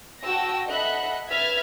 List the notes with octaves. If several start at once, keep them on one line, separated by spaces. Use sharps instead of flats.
F#4 G5 A5 E6 A#6
A4 D#5 E5 F#5 B5 F#6
B4 E5 F6 G#6 A6 B6